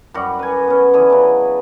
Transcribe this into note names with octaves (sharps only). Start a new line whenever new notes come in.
F#2 G3 F#4
B4 G#5
B3 C#4
D3 E3 G#4
C#3 F#3